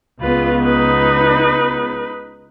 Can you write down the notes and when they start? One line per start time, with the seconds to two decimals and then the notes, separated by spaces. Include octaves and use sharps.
0.21 C#2 B3 F4 B4
0.62 D#4 B4